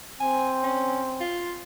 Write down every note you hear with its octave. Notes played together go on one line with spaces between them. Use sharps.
C4 G#5
C#4
F4